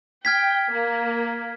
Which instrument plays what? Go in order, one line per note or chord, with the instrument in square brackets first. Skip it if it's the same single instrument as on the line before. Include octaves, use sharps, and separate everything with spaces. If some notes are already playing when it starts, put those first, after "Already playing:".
[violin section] G5 [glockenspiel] F6 G#6 B6
[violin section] A#3